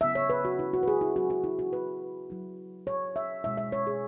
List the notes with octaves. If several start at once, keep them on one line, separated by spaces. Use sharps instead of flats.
C#3 F#3 B3 E4 E5
C#5
B4
F#4
E4
F#4
B4
G#4
E4
F#3 B3 E4 F#4
F#4
E4
F#4
B4
F#3 E4
C#5
E5
B2 G#3 C#4 E4 E5
E5
C#5
G#4